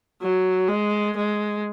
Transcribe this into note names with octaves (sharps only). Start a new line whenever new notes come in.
F#3
G#3
G#3